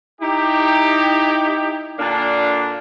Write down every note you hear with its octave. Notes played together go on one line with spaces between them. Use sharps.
D#4 E4 G4
A#2 D3 A#3 D4